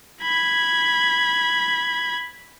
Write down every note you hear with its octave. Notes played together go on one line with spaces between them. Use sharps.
B5 G#6